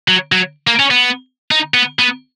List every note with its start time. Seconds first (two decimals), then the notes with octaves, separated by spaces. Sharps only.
0.08 F#3
0.32 F#3
0.67 A#3
0.79 C#4
0.91 B3
1.51 D#4
1.74 B3
1.99 B3